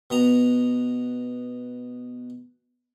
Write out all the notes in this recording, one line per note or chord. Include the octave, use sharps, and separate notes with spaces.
B2 B3 A#5